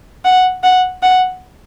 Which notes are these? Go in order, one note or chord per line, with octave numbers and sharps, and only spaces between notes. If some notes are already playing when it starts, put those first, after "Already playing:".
F#5
F#5
F#5